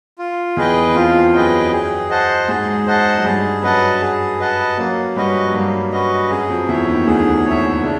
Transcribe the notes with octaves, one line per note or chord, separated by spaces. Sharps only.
F4
E2 E3 G#4 B4 D#5 G5
F2 F3 F4
F#2 F#3 G#4 B4 D#5 G5
G#4
C5 D#5 F#5 A5
G#2 G#3 G#4
C5 D#5 F#5 A5
F#3
G2 G3 G#4
F#2 F#3 B4 D#5 F#5 A5
G#4
B4 D#5 F#5 A5
F#2 F#3 A#3
G2 G3 C#4 F#4 B4 D#5
F#3
G2 G3 A#3
C#4 F#4 B4 D#5
F#2 F#3 G#4
F2 F3
E2 E3 C#5 E5
D#2 D#3
D2 D3 G#4
C#5 E5
C#3 D4